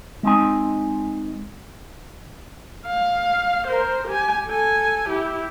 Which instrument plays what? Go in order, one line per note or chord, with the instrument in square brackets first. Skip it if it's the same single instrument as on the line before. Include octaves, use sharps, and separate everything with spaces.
[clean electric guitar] G#3 C4 D#4 G#5
[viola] F5
A#4 C5
G4 G#5
A4 G#5
E4 G4